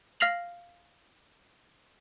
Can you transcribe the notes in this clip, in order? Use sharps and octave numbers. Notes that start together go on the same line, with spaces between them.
F5 F6 A#6 C7 F7 F#7